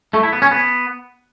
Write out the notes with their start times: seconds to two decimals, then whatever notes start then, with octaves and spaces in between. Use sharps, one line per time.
0.14 A3
0.23 E4
0.33 B3
0.42 C#4
0.51 B3